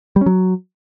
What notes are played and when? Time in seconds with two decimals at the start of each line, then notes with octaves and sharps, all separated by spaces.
0.16 G3
0.21 C#4
0.26 F#3